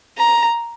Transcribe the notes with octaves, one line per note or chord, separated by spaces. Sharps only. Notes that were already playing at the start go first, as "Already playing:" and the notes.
A#5